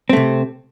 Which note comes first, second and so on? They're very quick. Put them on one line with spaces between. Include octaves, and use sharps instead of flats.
C4 A3 C3